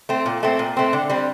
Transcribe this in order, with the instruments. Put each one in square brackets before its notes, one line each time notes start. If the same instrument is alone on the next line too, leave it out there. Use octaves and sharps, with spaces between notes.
[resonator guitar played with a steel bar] A3 C4
A#2
A3 C4
A#2
A3 C4
D3
G3 C4